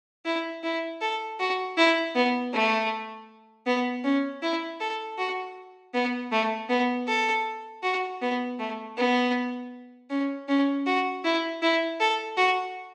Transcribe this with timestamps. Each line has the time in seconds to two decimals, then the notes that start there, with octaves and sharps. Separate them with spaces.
0.25 E4
0.64 E4
1.01 A4
1.39 F#4
1.77 E4
2.15 B3
2.53 A3
3.66 B3
4.04 C#4
4.42 E4
4.80 A4
5.18 F#4
5.94 B3
6.32 A3
6.69 B3
7.08 A4
7.83 F#4
8.22 B3
8.59 A3
8.98 B3
10.11 C#4
10.48 C#4
10.87 F#4
11.24 E4
11.62 E4
12.00 A4
12.38 F#4